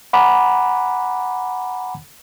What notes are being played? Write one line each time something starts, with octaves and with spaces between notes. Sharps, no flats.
F#5 G#5 A#5 B5 D6